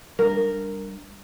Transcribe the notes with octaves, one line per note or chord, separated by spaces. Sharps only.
G3 D4 A#4